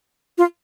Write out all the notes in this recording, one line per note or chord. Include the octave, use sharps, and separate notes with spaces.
F4